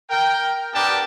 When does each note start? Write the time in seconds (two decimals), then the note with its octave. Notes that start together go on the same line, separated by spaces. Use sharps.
0.10 A#4 G5
0.74 B3 D4 G4 A#4 G5 A5